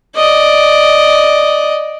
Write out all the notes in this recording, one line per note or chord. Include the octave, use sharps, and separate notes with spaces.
D5 D#5